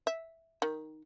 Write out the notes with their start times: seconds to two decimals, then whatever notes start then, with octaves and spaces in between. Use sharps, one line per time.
0.07 E5
0.62 D#3